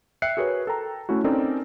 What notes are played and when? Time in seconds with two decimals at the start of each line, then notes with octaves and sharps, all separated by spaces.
0.22 E5 G5 F#6 C7 C#7
0.37 F#4 G#4 A#4 B4 C#5
0.67 A4 G5 A#5
1.09 A3 C#4 E4 F#4
1.24 C4 C#4 D#4 A4 A#4 D5